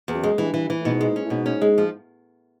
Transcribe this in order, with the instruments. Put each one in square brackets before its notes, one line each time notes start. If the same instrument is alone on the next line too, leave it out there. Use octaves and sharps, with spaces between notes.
[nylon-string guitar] E2
[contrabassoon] F#2
[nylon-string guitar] G#3
[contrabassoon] G2 [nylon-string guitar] E3
[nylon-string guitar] E3
E3
[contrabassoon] A2
[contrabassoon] G#2 [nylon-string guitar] B2
[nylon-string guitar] G#3
C#4
[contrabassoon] A2
[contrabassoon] G#2 [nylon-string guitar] B2
[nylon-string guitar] C#4
G#3
F3